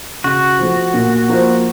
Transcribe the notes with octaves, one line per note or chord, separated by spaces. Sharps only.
C#3 F#4
F3 A3
A#2
F3 A#3 F4 C5